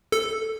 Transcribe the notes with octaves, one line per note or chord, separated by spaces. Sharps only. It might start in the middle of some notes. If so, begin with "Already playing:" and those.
A4